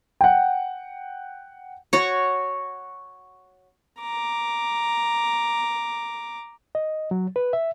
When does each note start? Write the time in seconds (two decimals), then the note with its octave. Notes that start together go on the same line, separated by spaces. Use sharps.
0.21 F#5 G5
1.93 F#4 C#5
4.01 A#5 D6
6.75 D#5
7.11 F#3
7.36 B4
7.53 E5